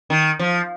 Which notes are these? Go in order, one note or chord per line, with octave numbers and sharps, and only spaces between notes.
D#3
F3